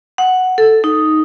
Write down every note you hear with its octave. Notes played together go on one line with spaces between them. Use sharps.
F#5
A4
D#4